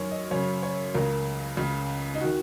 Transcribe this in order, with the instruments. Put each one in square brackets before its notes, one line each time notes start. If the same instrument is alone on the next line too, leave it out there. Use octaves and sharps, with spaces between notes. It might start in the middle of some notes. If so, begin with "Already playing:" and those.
Already playing: [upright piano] F#2 D#3 A#4 C#5
D#5
F#2 C#3 C#5
C#5
C#2 C#3 A#4
C#2 C#3
D#4
D#3 F#4